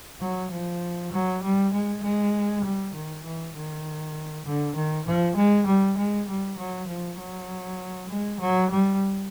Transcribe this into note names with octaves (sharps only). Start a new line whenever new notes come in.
F#3
F3
F#3
G3
G#3
G#3
G3
D#3
E3
D#3
D3
D#3
F3
G#3
G3
G#3
G3
F#3
F3
F#3
G#3
F#3
G3